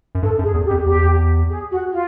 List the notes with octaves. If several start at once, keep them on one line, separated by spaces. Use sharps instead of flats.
F#2
G2 A4
F#2
G#4
E2
G4
F2
E2 G4
G#4
F#4
F4